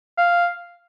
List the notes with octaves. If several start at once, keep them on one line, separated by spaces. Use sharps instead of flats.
F5